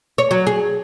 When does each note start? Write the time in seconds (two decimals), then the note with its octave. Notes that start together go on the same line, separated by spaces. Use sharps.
0.18 C#5
0.31 F#3
0.47 G#4